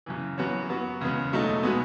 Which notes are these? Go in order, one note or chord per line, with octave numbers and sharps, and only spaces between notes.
F#2 C#3 E3
F#2 E3 B3 F#4 C#5
F#3 B3 F#4
E2 C#3 G#3 B3
B2 F#3 A3 D#4
B2 G#3 B3